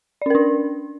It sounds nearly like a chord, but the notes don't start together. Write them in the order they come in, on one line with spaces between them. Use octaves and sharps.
D5 C#4 A#4 D4